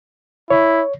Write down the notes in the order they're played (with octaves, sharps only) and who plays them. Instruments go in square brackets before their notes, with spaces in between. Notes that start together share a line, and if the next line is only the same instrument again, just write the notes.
[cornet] E4 [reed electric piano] C#5